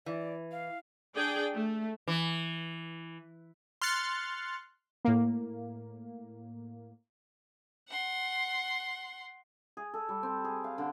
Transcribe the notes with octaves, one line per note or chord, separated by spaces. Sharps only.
E3 D5
F5
D4 G#4 D5 G5
A3
E3
C6 F6 F#6 A6 C#7
A2 A#3
F#5 C6
G#4
A4
G3
C4
G#4
F5
D3